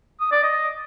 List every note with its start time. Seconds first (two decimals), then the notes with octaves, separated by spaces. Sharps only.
0.21 D#6
0.32 D5
0.43 D#5